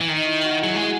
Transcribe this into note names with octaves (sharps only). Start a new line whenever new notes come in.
E3
D#3 D#4
E4
F#4
F#3 G#4
G#3 F#4
G#4